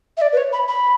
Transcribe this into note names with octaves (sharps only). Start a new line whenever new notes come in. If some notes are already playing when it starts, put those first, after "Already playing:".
E5
D5
B4
C#5
B5
B5